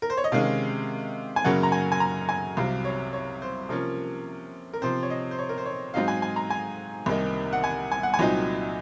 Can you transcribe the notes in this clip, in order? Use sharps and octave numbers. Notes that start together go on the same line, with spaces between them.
A#4
C5
C#5
D#5
C3 D#3 G#3 C#4 F5
G#5
F#2 C#3 F#3 A#3 C#4 F#5
A#5
G#5
G#5
A#5
G#5
C2 C3 F#3 F5
C#5
C#5
C5
C3 F3 A#3 C#4 A#4
A#4
C3 F3 C4 C5
C#5
D#5
C5
C#5
A#4
C5
C#5
G#2 F#3 C4 D#4 F5
G#5
G#5
A#5
G#5
C2 C3 D#3 A#3 D#4
F#5
G#5
G#5
F#5
G#5
C2 A#2 F#3 C4 D#4